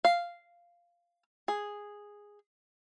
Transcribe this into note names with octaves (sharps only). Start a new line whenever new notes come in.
F5
G#4